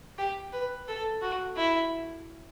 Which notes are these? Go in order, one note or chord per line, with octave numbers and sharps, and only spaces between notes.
G4
B4
A4
F#4
E4